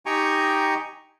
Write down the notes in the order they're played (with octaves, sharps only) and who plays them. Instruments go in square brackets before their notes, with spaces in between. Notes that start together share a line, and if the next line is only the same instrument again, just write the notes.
[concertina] D#4 G4 G5 G#5 A#5 C#6